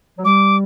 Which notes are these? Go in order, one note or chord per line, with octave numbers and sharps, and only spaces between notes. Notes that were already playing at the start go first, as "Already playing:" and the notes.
F#3
G3 D6